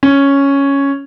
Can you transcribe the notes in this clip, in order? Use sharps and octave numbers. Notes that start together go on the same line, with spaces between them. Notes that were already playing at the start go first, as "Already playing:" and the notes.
C#4